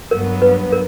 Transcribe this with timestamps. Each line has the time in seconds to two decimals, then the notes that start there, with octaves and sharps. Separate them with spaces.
0.11 G2 F#3 B3 A#4
0.42 B4
0.72 A#4